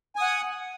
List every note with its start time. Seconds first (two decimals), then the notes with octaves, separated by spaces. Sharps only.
0.16 G#5
0.19 D#6
0.21 F#5